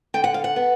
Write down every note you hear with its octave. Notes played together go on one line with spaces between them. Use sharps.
D3 G5
F#5
F5
F#5
B3